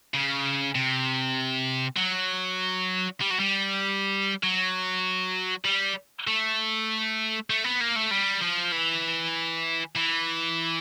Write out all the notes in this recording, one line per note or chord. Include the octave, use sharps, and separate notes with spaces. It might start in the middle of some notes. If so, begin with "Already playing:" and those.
C#3
C3
F#3
G3
F#3
G3
F#3
G3
A3
A3
B3
A#3
A3
G3
F3
E3
E3